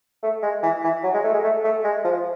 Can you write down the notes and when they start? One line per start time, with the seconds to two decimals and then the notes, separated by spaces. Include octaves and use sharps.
0.23 A3
0.43 G#3
0.63 E3
0.84 E3
1.04 F#3
1.14 G#3
1.24 A3
1.34 G#3
1.44 A3
1.64 A3
1.84 G#3
2.04 F3